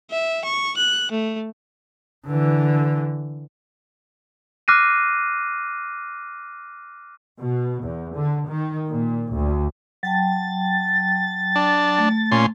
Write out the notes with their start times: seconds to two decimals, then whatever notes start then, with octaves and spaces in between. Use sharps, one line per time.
0.11 E5
0.44 C#6
0.77 F#6
1.11 A3
2.27 D3 E3
4.68 D6 F6 F#6 A#6 C7 D#7
7.39 B2
7.83 E2
8.16 D3
8.48 D#3
8.90 A#2
9.34 D2
10.03 F#3 G5 A5 A6
11.56 D4
11.98 A3
12.32 A#2 C#4 C6